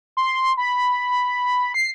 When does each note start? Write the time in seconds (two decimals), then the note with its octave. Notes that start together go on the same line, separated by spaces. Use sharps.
0.17 C6
0.57 B5
1.74 C7